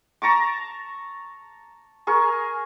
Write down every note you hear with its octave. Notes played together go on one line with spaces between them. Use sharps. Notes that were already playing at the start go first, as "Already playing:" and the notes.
A5 A#5 C#6 D6
G#4 A#4 C#6